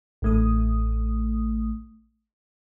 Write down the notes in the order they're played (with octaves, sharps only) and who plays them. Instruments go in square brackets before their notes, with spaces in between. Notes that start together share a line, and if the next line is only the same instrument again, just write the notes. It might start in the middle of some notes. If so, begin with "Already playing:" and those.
[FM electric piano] A1 A3 D#6